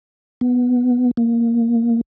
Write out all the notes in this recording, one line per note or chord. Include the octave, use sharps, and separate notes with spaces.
B3
A#3